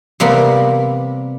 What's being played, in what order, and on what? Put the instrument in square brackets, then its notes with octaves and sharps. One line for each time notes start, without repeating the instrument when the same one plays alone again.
[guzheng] C3 G3 A#3 B3